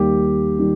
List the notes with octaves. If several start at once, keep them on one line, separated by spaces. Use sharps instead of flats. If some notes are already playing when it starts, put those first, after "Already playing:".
Already playing: D#2 D#3 G3 A#3 G4
D#3 G3